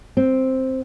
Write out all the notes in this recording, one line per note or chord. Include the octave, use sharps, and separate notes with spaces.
C4